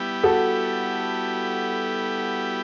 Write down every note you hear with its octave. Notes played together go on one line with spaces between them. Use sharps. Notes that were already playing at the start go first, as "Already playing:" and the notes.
Already playing: G3 B3 E4 G4
F#4 A4